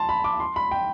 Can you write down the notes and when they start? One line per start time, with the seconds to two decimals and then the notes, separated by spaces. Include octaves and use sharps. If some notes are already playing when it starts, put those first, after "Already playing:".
Already playing: A5 C6
0.09 B5
0.24 D6
0.40 C6
0.56 B5
0.71 G5